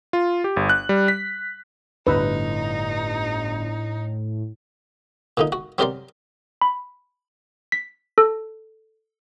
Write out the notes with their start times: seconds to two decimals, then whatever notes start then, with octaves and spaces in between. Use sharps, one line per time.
0.13 F4
0.44 G4
0.56 G1
0.69 F#6
0.89 G3
1.08 B6
2.07 G1 A2 D#4 B4 E6
5.37 A#2 D3 D#4
5.52 F#4
5.78 F#3 C4 G4 A#4 D5 C6
6.62 B5
7.72 B6
8.18 A4